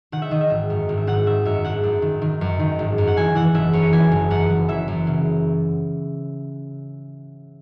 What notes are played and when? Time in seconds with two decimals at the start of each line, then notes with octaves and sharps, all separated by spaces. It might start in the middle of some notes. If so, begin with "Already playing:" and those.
0.12 D#3 F#5
0.22 E5
0.31 D#3 D#5
0.41 E5
0.50 G#1
0.70 F#2
0.89 G#1
0.97 E5
1.07 G#1 F#5
1.26 D#3 E5
1.45 F#2 E5
1.65 G#1 F#5
1.83 F#2
2.02 D#3
2.22 D#3
2.41 F#2
2.59 D#3
2.79 G#1
2.98 F#2
3.07 F#5
3.17 E3 G#5
3.35 E3 F#5
3.54 F#1 E5
3.73 F#2 C#5
3.93 E3 G#5
4.11 F#1
4.30 F#2 F#5
4.50 F#2
4.69 E3 E5
4.88 F#2
5.07 C#3